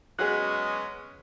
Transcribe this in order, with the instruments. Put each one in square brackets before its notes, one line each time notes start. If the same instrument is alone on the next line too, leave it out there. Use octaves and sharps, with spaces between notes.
[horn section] F#3 C#4 [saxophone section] G#3 B3 [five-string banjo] F#4 G#4 [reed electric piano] F#6